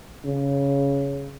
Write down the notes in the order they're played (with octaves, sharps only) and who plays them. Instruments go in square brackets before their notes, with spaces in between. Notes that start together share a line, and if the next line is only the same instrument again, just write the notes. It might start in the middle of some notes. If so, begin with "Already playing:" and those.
[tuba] C#3